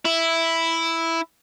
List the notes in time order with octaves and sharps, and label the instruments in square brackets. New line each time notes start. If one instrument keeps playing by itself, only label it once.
[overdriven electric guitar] E4